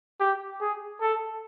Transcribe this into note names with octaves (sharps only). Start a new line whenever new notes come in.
G4
G#4
A4